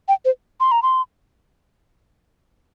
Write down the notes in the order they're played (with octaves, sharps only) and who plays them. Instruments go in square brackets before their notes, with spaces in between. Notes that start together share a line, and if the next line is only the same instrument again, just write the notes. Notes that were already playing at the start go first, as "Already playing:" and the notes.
[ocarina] G5
C5
C6
A#5
C6